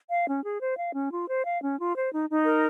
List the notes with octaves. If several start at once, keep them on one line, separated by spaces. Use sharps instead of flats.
F5
C#4
G#4
C5
F5
C#4
F4
C5
F5
C#4
F4
C5
D#4
D#4
A#4